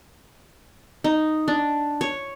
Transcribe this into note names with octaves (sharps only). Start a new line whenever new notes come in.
D#4
D4
C#5